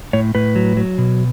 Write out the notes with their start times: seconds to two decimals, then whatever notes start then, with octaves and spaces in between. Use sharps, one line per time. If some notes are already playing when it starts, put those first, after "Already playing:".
0.13 A2 C#5
0.35 A2 B4
0.56 F#3
0.77 F#3
0.98 B2